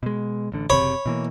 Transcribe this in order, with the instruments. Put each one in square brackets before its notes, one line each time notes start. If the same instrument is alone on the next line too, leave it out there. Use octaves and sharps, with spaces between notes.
[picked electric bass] B2 G#3
A1 D3
[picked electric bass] F#1 C3 [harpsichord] C#5 B5
[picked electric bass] B2 E3 A#3